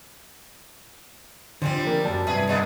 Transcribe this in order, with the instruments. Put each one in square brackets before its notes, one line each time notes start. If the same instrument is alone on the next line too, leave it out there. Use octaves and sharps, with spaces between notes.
[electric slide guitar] D3 F3 [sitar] G3 G#3 C4 [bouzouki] D4 G4 C5
[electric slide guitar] A#3 [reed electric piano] A#4
[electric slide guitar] F#2 F#3 [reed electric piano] D5 A5
[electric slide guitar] G2 [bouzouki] C3 E4 [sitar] G#4 B4
[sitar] C3 A#3 B3 [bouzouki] D#4 D#5 G#5